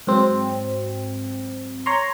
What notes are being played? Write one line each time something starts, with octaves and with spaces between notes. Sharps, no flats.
G#2 F#3 C4
C#5 A#5 C6